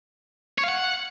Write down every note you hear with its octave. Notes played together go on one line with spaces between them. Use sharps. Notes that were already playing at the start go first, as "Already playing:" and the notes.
C#5
F5
F#5